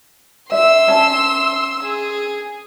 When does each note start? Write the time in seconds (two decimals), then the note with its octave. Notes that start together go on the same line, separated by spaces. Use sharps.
0.52 E5 C6 E6
0.88 C#4 E5 A5
1.83 G#4